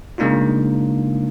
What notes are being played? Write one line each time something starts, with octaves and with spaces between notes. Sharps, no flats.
C#3 G#3 A#3 D4 D#4 F4